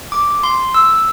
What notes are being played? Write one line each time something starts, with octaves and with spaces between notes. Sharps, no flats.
D6
C6
E6